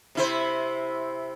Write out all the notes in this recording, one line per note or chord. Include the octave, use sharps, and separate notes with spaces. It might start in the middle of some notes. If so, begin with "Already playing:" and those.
C3 E4 C5